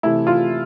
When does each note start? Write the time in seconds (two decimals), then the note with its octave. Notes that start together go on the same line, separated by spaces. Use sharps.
0.03 C3 E3 A3 E4
0.27 F4